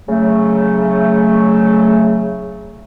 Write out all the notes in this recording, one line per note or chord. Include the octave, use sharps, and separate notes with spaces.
C#3 F#3 A3